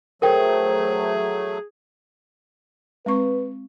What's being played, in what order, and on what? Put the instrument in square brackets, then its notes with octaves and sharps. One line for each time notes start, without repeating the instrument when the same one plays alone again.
[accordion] F#3 A3 [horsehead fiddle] G#4 [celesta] A#4 G5 [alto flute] C5
[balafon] G#3 C4 C#6 [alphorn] B4